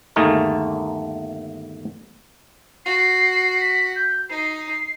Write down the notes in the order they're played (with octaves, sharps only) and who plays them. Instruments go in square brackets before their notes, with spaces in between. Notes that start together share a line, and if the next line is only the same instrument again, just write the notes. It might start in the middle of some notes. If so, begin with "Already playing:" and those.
[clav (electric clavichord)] G1 D#2 A3 D#4 G#4 A#4
[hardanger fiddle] F#4 [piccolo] C7
[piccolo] B6
G6
[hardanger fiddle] D#4 [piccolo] C7